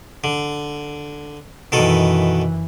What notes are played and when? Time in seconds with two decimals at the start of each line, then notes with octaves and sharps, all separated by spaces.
0.24 D3
1.72 F#2 B2 D#3 E3 A4